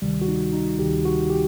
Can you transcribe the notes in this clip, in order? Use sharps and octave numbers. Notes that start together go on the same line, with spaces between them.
D2 C3 D#3 G3
F#4
D#4
D#4
D2 C3 D#3 G4
F#4
G4